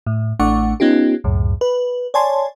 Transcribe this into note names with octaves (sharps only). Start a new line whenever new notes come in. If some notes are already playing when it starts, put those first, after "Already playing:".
A2
A1 A3 D4 F#5 C#6 D6
B3 C#4 D#4 F4 G4
C#2 F#2 A2
B4
C#5 D5 G#5 A5 C6